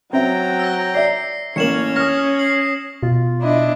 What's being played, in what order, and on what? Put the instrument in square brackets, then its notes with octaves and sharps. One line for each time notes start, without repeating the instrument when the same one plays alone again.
[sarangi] F#3 [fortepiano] C4 E5 [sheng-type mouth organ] G5 A#5
[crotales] E6 A#6
[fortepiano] D5 E5 [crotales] C7
[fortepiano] A1 A#3 [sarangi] C#4 [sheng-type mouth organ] C#5 [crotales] C#7 E7 F#7
[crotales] D#6 A#6 [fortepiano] F6
[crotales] C7 F#7
[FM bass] B2 [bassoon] F4
[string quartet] D4 E4 D#5